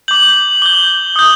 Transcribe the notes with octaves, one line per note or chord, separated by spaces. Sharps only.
D6 G6 F#7
D6 G6 G7
D#6 G6